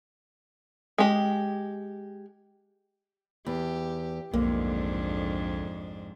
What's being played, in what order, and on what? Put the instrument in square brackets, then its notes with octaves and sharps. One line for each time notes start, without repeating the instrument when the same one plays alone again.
[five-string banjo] G#3 G4
[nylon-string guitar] E2 [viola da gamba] G4
[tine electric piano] B1 [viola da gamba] F2 G#2 D4 [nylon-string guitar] D3 A#3